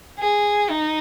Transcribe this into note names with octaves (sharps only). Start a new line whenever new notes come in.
G#4
D#4